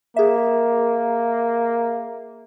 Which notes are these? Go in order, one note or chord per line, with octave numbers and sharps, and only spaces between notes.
A#3 G#4 E5